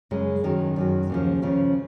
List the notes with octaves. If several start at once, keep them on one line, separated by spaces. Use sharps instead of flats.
F#2 C#3 G#3
F#2 D#3 F#3
F#2 D#3 F#3
D#2 C#3 F3
D#2 C#3 F3